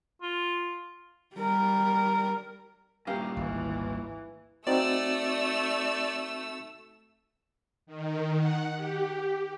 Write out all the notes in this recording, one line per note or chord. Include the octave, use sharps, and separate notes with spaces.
F4
G3 A#4
G2 A#2 C#4 G4 A#4 F5
G#1 D2 E3
A3 C4 D#4 F#4 D5 E6
D#3
F#5
G4